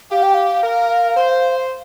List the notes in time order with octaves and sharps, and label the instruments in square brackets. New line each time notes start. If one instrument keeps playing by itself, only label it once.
[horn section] G4 [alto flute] F5
[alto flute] G5
F5
[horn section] A#4
C5